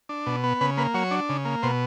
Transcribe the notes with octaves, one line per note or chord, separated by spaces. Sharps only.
D4
B2
B3
C#3 B4
A#3 B4
F#3 C#5
D4
C#3
A#3
B2 C5